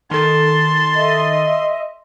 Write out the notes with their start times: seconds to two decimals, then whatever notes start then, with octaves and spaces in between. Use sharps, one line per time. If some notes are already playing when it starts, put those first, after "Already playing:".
0.11 D#3 A4 A5 C6
0.96 D#5 E5